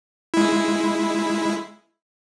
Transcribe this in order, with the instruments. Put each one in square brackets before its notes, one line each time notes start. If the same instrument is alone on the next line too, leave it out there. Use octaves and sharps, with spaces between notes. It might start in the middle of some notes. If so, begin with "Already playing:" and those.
[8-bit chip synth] G#3 E4